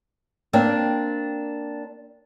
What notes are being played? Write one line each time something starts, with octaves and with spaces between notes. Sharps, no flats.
A#3 C4 D4 G5